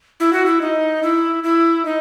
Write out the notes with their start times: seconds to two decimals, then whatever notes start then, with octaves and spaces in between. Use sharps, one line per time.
0.20 E4
0.33 F#4
0.46 E4
0.61 D#4
1.03 E4
1.43 E4
1.85 D#4